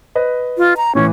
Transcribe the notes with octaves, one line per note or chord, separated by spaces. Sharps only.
B4 D#5
F4
A#5
A2 E3 C#4